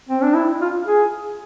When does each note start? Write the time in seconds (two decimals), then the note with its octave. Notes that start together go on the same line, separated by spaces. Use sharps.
0.09 C4
0.23 D4
0.35 E4
0.61 F4
0.86 G#4